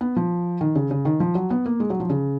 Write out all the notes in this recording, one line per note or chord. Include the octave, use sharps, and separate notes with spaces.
B3
F3
D#3
C#3
C#3
D#3
F3
F#3
B3
A#3
G#3
F#3
F3
C#3